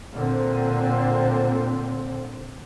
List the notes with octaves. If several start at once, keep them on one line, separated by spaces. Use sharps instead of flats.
A#2 D3 C4